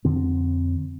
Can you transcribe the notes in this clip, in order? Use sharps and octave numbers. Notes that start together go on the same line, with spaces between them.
F2 D3 C4